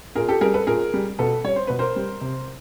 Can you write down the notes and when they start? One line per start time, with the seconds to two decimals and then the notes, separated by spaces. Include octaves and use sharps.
0.15 A#2 G#4 A#4
0.29 G4 A4
0.41 G3 G#4 A#4
0.54 A4 B4
0.67 A#2 G#4 A#4
0.94 G3
1.19 B2 A4 B4
1.44 G3 C#5
1.56 C5
1.67 B2 B4
1.79 A#4 C5
1.96 G3
2.21 C3